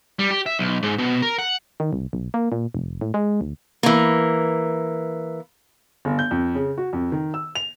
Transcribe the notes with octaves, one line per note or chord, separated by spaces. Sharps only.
G3
G4
E5
B1
G#2
B2
A#4
F#5
D#3
C2
B1
A#3
A#2
F1
A2
G#3
D2
E3 A#3
G1
G6
F2
C#3
F#4
F2
D#3
E6
F7